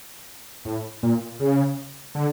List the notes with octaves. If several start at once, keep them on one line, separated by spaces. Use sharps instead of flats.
A2
A#2
C#3
D3